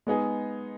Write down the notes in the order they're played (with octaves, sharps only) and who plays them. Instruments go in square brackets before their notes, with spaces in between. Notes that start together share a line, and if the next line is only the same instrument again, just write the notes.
[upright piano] G#3 B3 D#4 G#4